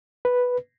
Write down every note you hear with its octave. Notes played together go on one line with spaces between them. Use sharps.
B4